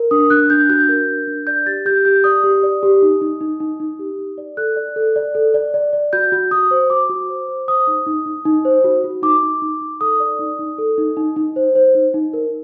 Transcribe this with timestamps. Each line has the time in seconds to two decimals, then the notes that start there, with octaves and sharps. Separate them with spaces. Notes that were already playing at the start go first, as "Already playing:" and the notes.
Already playing: A#4
0.11 D4 D#6
0.30 D4 F#6
0.50 D4 G6
0.70 F#4 G6
0.89 A#4
1.09 D4
1.27 D4
1.47 D5 G6
1.66 G4 A6
1.86 G4 G6
2.05 G4 G6
2.24 D5 D#6
2.44 G4
2.63 D5
2.83 G4
3.02 D#4
3.21 D#4
3.41 D#4
3.60 D#4
3.80 D#4
3.99 G4
4.19 D#4
4.38 D5
4.57 A4 F#6
4.76 D5
4.96 A4
5.16 D5
5.35 A4
5.54 D5
5.74 D5
5.93 D5
6.13 F#4 G6
6.32 F#4
6.51 F#4 D#6
6.71 C5
6.90 F#4 D6
7.10 F#4
7.29 C5
7.48 C5
7.68 C5 D#6
7.87 D#4
8.07 D#4
8.26 D#4
8.45 D#4
8.65 C5
8.84 F#4
9.04 F#4
9.23 D#4 D6
9.43 D#4
9.62 D#4
9.81 D#4
10.01 A4 D#6
10.20 D5
10.39 D#4
10.59 D#4
10.78 A4
10.98 D#4
11.17 D#4
11.36 D#4
11.56 C5
11.75 C5
11.95 D#4
12.14 D#4
12.33 A#4